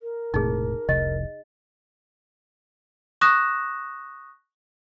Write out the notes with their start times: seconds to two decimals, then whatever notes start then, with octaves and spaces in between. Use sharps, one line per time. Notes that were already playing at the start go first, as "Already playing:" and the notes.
0.01 A#4
0.34 E1 A2 C3 D#4 G#4
0.89 F1 C2 C3 D#5
3.21 C#6 D#6 F#6 A#6 E7